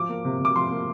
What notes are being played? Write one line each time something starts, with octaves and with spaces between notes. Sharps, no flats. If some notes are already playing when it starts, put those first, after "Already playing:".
Already playing: F3 D6
A#3
C3
C3
D6
F3 C6
A#3